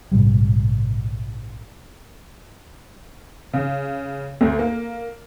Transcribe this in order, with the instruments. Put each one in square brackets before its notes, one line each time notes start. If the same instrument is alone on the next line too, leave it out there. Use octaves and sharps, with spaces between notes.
[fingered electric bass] A#1 G#2 C3 G3
[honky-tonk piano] C#3
D2
A#3